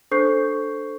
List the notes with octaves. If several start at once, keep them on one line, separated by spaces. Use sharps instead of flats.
D4 A4 C5 C#6 G6 C7